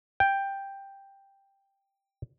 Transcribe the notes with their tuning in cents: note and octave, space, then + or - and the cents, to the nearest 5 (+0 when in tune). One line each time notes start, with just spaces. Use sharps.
G5 +5